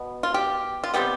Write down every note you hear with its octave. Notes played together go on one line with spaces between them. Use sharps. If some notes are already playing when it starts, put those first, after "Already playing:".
Already playing: B2 B3
F4
G4
F4
C3 G3 B3 G4